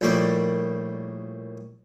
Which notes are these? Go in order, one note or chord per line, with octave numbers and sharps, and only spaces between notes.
A#1 A2 G3 A#3 D5